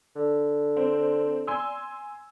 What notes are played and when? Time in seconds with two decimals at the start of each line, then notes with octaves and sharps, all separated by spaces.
0.15 D3
0.77 C4
1.47 G#5 C6 E6